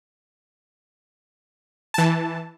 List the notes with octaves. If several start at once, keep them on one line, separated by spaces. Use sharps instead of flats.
E3 A5